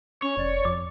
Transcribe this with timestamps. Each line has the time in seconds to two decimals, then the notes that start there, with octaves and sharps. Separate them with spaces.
0.22 C#4 C#5
0.37 F1 D5
0.65 F2 D6